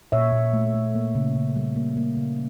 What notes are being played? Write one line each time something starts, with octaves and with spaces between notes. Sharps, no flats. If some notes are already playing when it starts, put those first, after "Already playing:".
A#2 C#5 E5
A#2
A3
A3
A#3
C#3
C#3
G3
A#3
A#3
C#3